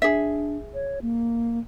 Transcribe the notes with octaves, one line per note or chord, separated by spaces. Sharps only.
D4 G#4 E5
C#5
A#3